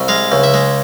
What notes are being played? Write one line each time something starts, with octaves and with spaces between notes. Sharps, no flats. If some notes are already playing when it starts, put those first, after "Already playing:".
Already playing: C2
G#3 F5
C#2
E5
G#3